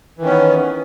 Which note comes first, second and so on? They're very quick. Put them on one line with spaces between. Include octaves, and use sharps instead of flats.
E3 D#3 C#4 B3